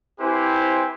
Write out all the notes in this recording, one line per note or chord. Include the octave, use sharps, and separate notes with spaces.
C4 E4 G4 B4 C5 G#5